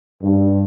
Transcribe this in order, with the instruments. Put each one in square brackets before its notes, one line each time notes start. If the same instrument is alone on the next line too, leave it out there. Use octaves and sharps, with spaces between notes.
[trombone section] G2